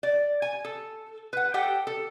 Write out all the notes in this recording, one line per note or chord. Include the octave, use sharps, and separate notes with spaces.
D5
G#5
A4
B4 F#5
G4 A4 F#5 G5
A4